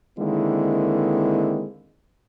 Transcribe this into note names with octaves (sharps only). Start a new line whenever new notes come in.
D3 D#3 G#3 A#3 C4 E4